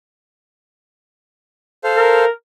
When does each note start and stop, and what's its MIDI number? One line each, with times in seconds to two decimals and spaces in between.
1.84 2.25 69
1.84 2.25 72
1.84 2.25 77
1.97 2.29 70